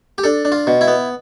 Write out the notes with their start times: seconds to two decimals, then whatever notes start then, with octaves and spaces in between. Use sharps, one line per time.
0.18 G4
0.24 D4 A4
0.45 D4
0.52 F4
0.67 B2
0.81 E4
0.88 B3